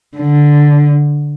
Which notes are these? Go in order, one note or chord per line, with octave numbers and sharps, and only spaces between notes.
D3